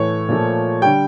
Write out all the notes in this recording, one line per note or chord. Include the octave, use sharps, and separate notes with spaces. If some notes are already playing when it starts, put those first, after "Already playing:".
Already playing: A2 E3 A3 C#5
A#2 F3 A3
D3 G3 G5